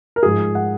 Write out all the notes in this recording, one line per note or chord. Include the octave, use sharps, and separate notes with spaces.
A#4
G#2 F3 G#4
F#5